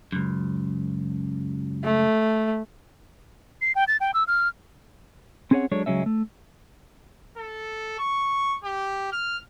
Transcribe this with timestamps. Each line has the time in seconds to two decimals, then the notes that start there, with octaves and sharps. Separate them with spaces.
0.12 C#2 F#2
1.84 A3
3.61 C7
3.75 G5
3.88 A6
4.00 G5
4.14 E6
4.27 F6
5.51 C4 C#4 G#4 B4 C#5 F#5
5.71 F#3 G#3 D4 A4 C#5
5.86 C#2 F#3 G#3 C#4 E5
6.06 A3
7.38 A4
7.99 C#6
8.64 G4
9.12 F6